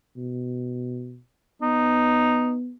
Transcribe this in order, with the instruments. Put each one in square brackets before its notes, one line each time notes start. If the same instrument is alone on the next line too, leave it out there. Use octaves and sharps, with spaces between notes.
[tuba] B2
[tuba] B3 [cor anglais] D#4